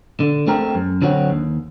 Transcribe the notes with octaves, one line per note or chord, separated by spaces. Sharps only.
D3
A3 C4 G4 A#4
F#2
D3 F#3 C4 F#4
D#2